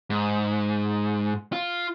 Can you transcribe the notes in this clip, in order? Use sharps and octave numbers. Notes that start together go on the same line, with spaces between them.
G#2
F4